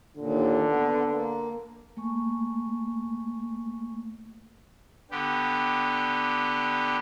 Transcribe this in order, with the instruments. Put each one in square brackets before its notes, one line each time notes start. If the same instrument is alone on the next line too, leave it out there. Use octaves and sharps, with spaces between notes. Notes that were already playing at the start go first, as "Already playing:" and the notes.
[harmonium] D#2 A#2 [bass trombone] D3
[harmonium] B3
A#3
[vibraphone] A3 A#3 G#5 C#6
[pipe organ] D3 B3 G4